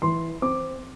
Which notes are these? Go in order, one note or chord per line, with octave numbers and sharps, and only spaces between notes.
E3 C6
C4 D6